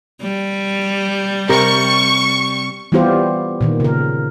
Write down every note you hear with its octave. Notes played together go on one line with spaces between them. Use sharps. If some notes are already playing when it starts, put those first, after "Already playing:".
G3
C3 A#4 C#6
E3 G3 B3 F4 G4 C5
A#2 D#3
C#3 A#4